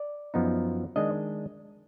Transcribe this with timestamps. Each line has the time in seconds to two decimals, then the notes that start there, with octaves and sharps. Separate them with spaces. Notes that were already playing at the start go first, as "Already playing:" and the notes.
Already playing: D5
0.34 F#2 F3 B3 D#4
0.96 D#3 G#3 D4 D#5